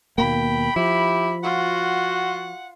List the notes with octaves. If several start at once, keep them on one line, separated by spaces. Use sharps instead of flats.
D#2 B2 A#3 G5 B5
F3 E4 G4
F4 F#4 F#5